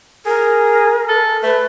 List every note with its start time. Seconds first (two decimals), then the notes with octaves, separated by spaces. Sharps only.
0.26 G#4 A#4
1.09 A4
1.43 A3 B4